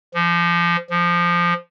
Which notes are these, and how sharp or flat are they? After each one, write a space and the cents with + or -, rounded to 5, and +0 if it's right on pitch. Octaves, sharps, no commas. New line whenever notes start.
F3 -25
F3 -10